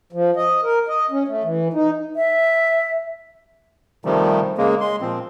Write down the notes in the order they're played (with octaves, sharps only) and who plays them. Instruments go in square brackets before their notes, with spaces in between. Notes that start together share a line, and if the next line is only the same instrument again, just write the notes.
[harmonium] F3
D#5
A#4
D#5
C#4
A3
E3
D#4
[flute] E5
[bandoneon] C3 D#3 F3 G3 A3
C#3 G#3 A#3
G#3 C6
A#2 F3 C4